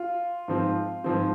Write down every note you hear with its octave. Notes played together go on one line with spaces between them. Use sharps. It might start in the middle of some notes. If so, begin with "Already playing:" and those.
Already playing: F4
G#2 F3 C4
G#2 F3 C4